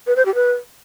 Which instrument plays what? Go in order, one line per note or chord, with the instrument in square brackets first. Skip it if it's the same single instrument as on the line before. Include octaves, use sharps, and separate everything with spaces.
[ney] B4
C5
G4
B4